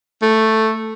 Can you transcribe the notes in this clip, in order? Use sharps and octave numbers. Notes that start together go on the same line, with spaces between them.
A3